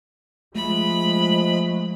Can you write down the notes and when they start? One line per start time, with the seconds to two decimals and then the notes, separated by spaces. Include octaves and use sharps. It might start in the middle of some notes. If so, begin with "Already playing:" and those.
0.55 F3 G#3 A3 B5